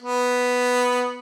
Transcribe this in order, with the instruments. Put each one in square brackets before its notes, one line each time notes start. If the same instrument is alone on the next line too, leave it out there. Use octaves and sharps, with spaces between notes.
[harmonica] B3